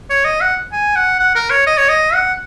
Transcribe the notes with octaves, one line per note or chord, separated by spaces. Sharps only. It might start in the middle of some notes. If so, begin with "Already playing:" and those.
C#5
D#5
F#5
G#5
F#5
F#5
A#4
C#5
D#5
C#5
D#5
F#5